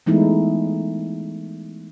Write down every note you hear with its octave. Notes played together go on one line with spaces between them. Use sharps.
E3 G#3 A3 B3 D#4 E4